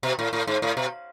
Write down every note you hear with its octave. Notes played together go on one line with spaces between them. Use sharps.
B2
A2
A2
G#2
A2
B2